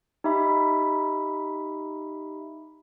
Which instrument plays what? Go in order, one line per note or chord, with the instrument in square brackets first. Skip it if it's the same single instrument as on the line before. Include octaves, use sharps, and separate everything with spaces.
[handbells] D#4 G4 E5 B5